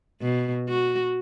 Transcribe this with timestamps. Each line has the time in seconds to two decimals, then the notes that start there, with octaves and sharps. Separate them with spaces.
0.21 B2
0.69 F#4